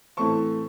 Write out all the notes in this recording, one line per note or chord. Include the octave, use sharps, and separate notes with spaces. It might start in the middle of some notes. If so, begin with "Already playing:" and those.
A2 E3 A3 C4 A5 C#6